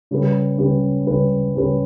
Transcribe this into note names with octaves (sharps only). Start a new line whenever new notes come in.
C#3 G3 C#4 G4 B4
C#3 G3 C#4 G4 B4
C#3 G3 C#4 G4 B4
C#3 G3 C#4 G4 B4